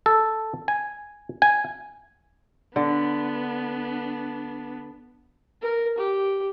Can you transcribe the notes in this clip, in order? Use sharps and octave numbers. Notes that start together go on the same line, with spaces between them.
A4
G#5
G#5
D3 B3 D4
A#4
G4